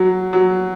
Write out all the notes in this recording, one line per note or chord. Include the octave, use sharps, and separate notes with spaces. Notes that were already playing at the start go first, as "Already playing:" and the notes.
Already playing: F#3
F#3